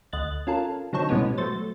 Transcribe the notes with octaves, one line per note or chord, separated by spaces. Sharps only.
D2 D#5 F#6 A6
C#4 F4 A4 A#4
D3 F#3 C4 D#4 A4 C#5
G#2 B2 E3 G3 B3 C#4
F#3 A3 C5 A6